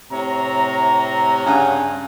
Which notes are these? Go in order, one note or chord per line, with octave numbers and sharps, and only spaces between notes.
A2 C3 C#5 A#5
G2 C#3 C#4 D4 F#5 G#5